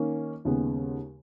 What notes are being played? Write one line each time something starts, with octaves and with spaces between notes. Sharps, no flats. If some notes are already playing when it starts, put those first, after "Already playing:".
Already playing: D#3 A#3 C#4
D#2 C#3 G#3 B3